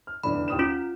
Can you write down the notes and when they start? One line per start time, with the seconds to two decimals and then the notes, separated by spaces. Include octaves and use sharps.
0.07 F6
0.24 F1 E2 D3 B5
0.48 D#2 D#6 E7
0.59 C#4 F4 E7